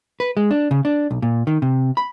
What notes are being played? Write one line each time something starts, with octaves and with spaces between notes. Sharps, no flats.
B4
G#3
D4
C#3
D4
B1
A#2
D#3
C3
B5